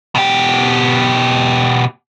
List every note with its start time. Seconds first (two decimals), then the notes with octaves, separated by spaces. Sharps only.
0.15 B2 G4